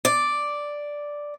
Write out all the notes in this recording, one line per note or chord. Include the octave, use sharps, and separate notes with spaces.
D5